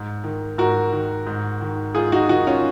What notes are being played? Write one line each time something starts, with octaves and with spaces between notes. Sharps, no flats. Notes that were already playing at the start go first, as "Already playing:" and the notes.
Already playing: G#2
D#3
G#2 F#4 A#4
D#3
G#2
D#3
G#2 F4 G#4
D#4 F#4
D#3 D#4 F#4
C#4 F4